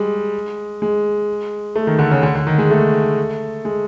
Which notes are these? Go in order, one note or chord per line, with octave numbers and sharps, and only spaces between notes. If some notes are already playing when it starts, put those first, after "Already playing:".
Already playing: G3 G#3
G#3
A3
D#3
D3
C#3
D3
D3
D#3
G#3
A3
G#3